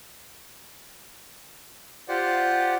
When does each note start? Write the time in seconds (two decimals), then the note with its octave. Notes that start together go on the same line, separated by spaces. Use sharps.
2.08 F4 G4 C5 D5 F#5